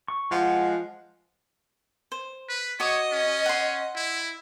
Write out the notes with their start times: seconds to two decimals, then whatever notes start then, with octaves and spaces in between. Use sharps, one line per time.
0.08 C#6
0.31 F3 G#3 F#5
2.12 C5
2.49 B4
2.80 F#4 C#5 D#5 D6 D#6
3.12 C#4
3.46 F#5 C6
3.96 E4